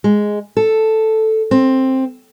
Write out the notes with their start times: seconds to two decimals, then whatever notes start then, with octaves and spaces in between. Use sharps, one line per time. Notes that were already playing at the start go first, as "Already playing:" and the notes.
0.04 G#3
0.57 A4
1.51 C4